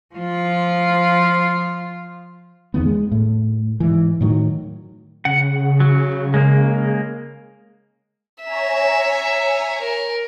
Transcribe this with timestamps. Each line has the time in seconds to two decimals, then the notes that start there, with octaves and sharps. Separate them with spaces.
0.15 F3 F4
2.74 E2 D#3 B3
2.85 G#3
3.12 A2
3.80 G#2 E3
4.21 A2 D#3 F#3
5.25 C#3 F#5
5.80 F#3
6.34 G#3 A#3
8.44 C#5 E5 G#5 A#5
9.82 A#4